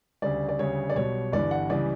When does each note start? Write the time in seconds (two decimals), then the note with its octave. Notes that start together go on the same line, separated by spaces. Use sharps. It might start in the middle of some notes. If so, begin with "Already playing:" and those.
0.22 D2 C#3 G3 D5
0.49 D5
0.59 D2 C#3 G3 C#5
0.90 D5
0.95 B1 B2 G3 C#5
1.32 G1 G2 E3 G3 D5
1.51 F#5
1.69 C#2 C#3 E3 G3 D5